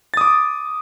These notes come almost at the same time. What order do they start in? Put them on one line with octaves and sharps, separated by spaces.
A6 D#6 D6